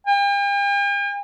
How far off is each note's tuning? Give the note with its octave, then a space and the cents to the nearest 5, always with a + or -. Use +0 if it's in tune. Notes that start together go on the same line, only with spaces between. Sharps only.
G5 +45